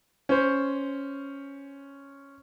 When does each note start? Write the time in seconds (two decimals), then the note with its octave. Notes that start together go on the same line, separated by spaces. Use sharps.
0.29 C#4 C5